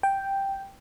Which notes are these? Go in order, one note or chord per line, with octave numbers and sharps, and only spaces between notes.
G5